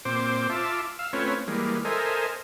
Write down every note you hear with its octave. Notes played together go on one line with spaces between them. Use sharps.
A#2 C4 C5 D6
F4 E5 A5 D6
F5 E6
A3 C4 C#4 F4 B4 C#5
E3 G3 G#3 A#3
A4 A#4 C5 D#5 E5 G#5